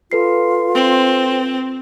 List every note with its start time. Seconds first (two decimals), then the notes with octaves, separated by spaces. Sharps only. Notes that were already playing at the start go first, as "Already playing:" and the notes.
0.12 F4 A4 B4 C7
0.75 C4